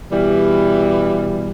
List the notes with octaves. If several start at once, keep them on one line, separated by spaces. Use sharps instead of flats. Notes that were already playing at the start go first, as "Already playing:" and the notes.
B2 E3 G3